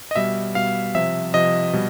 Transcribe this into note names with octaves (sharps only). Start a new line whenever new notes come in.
D#5
B2 G3 E5
B2 G3 F5
C3 F3 E5
C3 F3 D#5
B2 G3